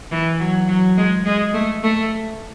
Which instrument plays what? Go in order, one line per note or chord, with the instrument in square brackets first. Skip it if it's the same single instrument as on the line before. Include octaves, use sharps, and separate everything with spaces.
[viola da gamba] E3
F#3
F#3
G#3
G#3
A3
A3